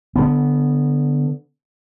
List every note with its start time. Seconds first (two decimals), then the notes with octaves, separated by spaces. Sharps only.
0.16 D3 B3